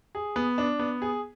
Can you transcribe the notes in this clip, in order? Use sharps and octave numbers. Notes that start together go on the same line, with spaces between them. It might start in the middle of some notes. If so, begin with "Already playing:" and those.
G#4
B3
D4
B3
G#4